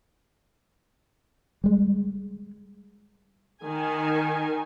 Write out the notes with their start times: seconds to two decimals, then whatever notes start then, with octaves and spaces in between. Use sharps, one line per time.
1.64 G3 G#3
3.63 D#3 G#5